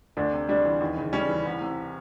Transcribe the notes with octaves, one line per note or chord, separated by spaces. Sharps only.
D2 D4
C3
G3 D4
E3
D#2
C#3
G3 C#4
E3
C2
C3